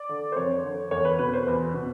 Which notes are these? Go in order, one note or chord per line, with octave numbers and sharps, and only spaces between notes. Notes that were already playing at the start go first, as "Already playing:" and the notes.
Already playing: D5
D3
C5
F2 C#5
D3
E2 C#5
B4
B2 B4
C5
E2 B4
B2